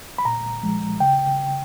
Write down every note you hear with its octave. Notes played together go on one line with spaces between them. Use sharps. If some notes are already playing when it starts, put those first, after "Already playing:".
B5
A#2 A#5
F3 G#3
C#3 G5